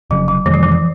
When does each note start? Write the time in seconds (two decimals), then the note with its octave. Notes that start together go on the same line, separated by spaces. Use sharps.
0.10 F1 F2 C#3 F#3
0.28 F#3
0.46 F2 C3 D#3 E3 G#3
0.54 F3
0.63 E3
0.72 F3